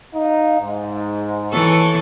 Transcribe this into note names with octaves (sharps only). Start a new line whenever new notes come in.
D#4 F5
G#2
E3 A4 C#5